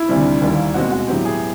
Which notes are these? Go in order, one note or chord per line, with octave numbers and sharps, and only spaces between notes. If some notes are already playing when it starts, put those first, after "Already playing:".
Already playing: E4
D2 C3 D#3 G3 C4
D#2 D#3 G3 A#3
B2 G#3 C4 F#4
F#4
A2 F#3 B3 G4
G#4